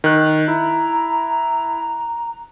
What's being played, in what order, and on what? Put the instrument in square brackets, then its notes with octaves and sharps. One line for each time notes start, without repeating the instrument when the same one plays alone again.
[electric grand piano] D#3 F#6
[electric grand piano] E4 [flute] A#5